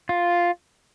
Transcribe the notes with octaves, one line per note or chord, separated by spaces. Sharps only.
F4